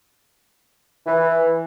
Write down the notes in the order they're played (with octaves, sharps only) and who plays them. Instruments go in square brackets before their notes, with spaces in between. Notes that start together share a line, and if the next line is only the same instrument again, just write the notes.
[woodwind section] E3